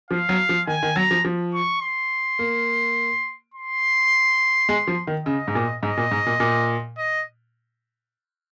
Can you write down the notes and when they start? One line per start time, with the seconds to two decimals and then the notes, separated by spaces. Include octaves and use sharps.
0.11 F3 F5
0.29 F#3
0.49 F3
0.67 D#3 G#5
0.83 D#3
0.96 F#3 A#5
1.11 F3
1.25 F3
1.54 C#6
1.82 C6
2.39 A#3
3.54 C6
4.69 G#3
4.87 F3
5.07 D#3
5.26 C#3 D#5
5.48 G#2
5.55 A#2
5.83 G#2 D#5
5.97 A#2
6.11 G#2
6.26 A#2
6.40 A#2
6.98 D#5